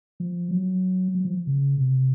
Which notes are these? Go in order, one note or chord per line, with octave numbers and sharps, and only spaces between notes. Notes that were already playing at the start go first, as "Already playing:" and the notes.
F3
F#3
F#3
F3
C#3
C3